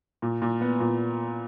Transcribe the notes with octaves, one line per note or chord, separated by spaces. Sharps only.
A#2
A#2
B3
A#2